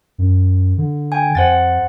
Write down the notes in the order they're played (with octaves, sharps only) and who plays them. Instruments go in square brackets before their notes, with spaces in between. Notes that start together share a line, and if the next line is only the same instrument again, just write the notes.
[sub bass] F#2
D3
[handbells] G5 G#5
[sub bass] F2 [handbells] C5 F#5 A6